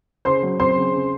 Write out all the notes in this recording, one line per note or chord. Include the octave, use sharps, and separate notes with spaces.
C#3 C5 C6
F#3
C4 C5 C6
C#3
C#3